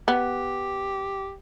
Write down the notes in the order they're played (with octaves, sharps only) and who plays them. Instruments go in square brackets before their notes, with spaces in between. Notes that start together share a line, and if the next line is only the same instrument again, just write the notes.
[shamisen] B3 [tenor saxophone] G4